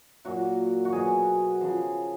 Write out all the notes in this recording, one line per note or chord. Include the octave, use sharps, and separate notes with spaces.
A#2 F#3 F#4
F#4
B2 F#3 G#4
C#3 F3